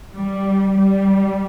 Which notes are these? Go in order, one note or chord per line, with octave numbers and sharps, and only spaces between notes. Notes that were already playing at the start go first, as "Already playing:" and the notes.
G3
G3